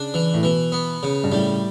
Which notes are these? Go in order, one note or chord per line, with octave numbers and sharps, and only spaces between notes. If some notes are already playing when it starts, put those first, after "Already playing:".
Already playing: C#3 D4
E3
A2
B2 E3
B3
C#3
G2
A2 G3